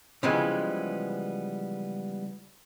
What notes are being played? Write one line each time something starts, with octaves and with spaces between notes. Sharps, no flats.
C#3 E3 F3 G3 G#3 B3